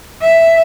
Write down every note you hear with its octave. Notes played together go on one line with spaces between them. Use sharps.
E5